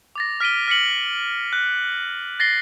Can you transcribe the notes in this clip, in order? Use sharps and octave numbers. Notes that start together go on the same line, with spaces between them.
D6 A6 A#6
F6 B6 D7 D#7 G7
F6 B6 C#7 F#7
F#6
A6 A#6 C7 G7